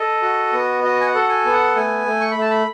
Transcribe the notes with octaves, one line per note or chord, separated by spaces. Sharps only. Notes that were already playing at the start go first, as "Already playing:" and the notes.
Already playing: A4 D#5
F#4
B3
F#4 D#5
G#5
F#5
A4
G#5
B3
F#5
A3 G#5
A3
C#6
A3 B5
A5
B5